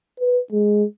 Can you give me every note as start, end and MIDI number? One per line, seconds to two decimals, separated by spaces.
0.20 0.39 71
0.52 0.84 56